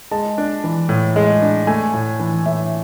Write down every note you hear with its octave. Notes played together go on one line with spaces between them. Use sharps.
G#3 A5
D4
E3
A2
G#3
D4
A3 G#5
A2
E3
A2 E5